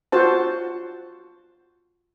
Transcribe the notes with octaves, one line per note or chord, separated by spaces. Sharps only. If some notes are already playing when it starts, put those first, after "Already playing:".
F4 F#4 C5 A5